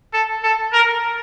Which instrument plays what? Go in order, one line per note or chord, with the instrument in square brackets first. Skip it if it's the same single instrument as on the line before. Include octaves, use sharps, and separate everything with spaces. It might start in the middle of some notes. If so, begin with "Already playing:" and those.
[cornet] A4
A4
A#4